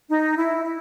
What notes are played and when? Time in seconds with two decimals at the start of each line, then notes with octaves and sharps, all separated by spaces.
0.08 D#4
0.37 E4
0.64 E4